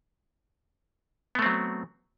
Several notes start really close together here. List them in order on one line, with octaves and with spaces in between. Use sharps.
B3 A3 C4 F#3